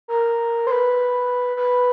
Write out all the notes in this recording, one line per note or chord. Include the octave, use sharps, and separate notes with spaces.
A#4
C5
B4
B4